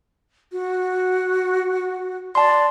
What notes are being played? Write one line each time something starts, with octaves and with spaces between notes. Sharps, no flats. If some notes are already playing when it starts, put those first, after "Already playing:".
F#4
D5 A5 C6